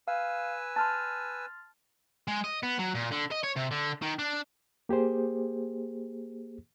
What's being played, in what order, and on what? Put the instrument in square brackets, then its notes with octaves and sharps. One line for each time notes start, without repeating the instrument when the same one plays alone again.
[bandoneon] B4 G#5 E6 [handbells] F5
[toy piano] A5 [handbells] C6 F6 A6
[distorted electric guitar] G#3
D#5
B3
F#3
A#2
D3
D#5
C#5
C3
D3
D#3
D4
[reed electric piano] A#3 G4 G#4 C5